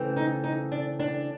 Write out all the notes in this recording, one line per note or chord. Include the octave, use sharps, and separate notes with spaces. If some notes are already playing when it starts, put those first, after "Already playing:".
Already playing: C#3 E3 A3 C4
D#4
D#4
D4
D4